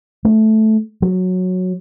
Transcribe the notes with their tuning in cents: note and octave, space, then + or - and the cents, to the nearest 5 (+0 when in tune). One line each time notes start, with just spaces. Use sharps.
A3 -10
F#3 -10